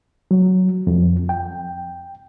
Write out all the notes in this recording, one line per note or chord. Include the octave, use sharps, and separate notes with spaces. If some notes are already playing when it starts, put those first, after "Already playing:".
F#3
F2
G5